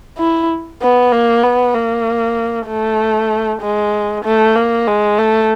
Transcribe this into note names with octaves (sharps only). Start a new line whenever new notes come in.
E4
B3
A#3
B3
A#3
A3
G#3
A3
A#3
G#3
A3